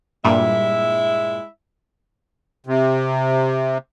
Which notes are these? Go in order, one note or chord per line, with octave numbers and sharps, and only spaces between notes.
G2 A#2 G3 G#3 E4 E5
C3